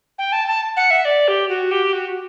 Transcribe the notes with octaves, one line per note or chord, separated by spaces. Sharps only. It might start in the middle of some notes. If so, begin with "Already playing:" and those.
G5
A5
A5
F#5
E5
D5
G4
F#4
G4
F#4